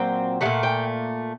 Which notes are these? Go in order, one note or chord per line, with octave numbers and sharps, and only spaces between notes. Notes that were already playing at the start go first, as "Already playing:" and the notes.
Already playing: A#2 F#3 C4 G5
A#2 F#3 A3 F#5
G5